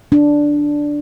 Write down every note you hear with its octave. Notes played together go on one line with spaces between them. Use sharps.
D4